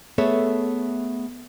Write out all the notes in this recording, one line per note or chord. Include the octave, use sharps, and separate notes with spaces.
A3 B3 G#4 A4 C#5 E5